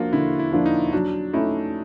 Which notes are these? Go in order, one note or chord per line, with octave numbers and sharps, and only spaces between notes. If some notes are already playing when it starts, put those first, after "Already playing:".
Already playing: F3 A#3 D4 F4 F#4
D3 E4
E4
F3 A#3 D4
D#4
F#3 D4
A3 C#4 D#4 E4